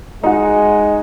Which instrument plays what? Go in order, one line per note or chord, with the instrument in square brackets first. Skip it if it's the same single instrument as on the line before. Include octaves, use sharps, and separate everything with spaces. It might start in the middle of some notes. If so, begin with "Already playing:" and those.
[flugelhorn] G#3 [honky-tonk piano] D#4 F#4